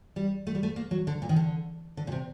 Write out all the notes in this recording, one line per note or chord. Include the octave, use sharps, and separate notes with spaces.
G3
A3
G3
A3
A#3
F#3
D3
A#2
D#3
D3
D3
A#2
C3